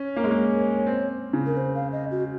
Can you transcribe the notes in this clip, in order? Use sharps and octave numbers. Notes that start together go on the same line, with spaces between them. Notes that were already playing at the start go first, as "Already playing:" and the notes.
Already playing: C#4 C#5
A#3
G#3
A#3
C4
C#3
A#4
C5
F5
D#5
F#4